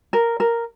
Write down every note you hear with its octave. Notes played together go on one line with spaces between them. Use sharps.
A#4
A#4